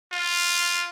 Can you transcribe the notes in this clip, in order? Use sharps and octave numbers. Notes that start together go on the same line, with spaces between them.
F4